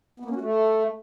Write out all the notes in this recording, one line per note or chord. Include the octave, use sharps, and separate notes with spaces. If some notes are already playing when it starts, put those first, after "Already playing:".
B3
A#3
C#4
F#4
A3